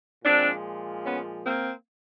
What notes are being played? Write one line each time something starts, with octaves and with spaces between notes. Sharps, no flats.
A#2 F3 G#3 C4 D4
B3 C#4
A#3 C4